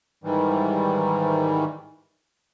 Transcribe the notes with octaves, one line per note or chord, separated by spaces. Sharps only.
G#2 D#3 E3 G3